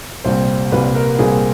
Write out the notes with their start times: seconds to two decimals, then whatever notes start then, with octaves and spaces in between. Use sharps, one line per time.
0.24 C2 A#2 G3 C4 C5
0.72 C2 A#2 G3 C4 B4
0.95 A#4
1.19 C2 A#2 G3 C4 G#4